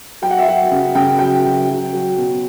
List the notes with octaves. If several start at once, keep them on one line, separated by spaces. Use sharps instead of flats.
F#3 G5
F#5
E5
F#3 F#5
C#3
C#3 G5
F#3 G5
F#3
F#3
F#3
B2